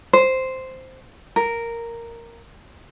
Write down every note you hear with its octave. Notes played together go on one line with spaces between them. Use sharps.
C5
A#4